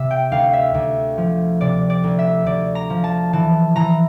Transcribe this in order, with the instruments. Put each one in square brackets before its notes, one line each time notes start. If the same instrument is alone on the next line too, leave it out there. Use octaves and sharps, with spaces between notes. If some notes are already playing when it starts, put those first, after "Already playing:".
Already playing: [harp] C3 E5
G5
D2 F5
E5
D2
F3
C3 D5
D5
D2
E5
D2 D5
A#5
F3
A5
E3 A5
E3 A#5